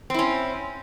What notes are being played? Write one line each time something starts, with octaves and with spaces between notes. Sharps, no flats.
C4 C#4 E4